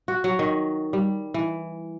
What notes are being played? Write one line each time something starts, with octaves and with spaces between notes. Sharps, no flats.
F#4
F#3
D#3
G3
E3